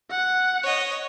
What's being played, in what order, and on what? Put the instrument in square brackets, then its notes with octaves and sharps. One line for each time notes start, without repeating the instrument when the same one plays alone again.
[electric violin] F#5
[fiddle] C#5 D#5